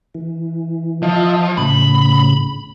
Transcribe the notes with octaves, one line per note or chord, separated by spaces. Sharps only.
E3
F3 F4 D#5 E5
A2 C#3 B5